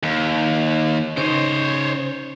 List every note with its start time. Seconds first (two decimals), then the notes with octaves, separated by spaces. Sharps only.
0.03 D#2
1.17 C#3 D#4 C5 C#5